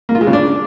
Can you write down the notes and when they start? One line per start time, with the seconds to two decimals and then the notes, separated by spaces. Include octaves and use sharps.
0.09 A#3
0.15 F4
0.21 G#3
0.27 C#3
0.33 D4